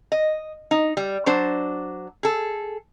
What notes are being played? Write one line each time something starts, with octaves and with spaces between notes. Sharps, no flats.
D#5
D#4
G3
F#3 D4 C5
G#4 A4